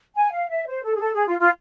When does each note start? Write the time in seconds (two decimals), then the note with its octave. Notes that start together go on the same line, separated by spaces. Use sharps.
0.15 G#5
0.32 F5
0.49 E5
0.66 C5
0.83 A4
0.95 G#4
1.00 A4
1.14 G#4
1.26 F4
1.39 F4